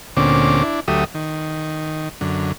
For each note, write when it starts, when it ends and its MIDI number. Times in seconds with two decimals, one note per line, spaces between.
0.17 0.63 38
0.17 0.63 46
0.17 0.63 50
0.17 0.63 60
0.17 0.63 61
0.17 0.63 86
0.63 0.80 62
0.63 0.80 64
0.88 1.04 38
0.88 1.04 54
0.88 1.04 57
0.88 1.04 67
0.88 1.04 76
0.88 1.04 87
1.14 2.09 51
2.21 2.52 42
2.21 2.52 50